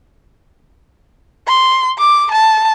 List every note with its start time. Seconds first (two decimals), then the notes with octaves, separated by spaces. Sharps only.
1.48 C6
1.98 D6
2.32 A5